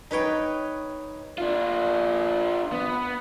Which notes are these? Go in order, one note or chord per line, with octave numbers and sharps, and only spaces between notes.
D#4 B4 C#5 G5
D4 F4
B3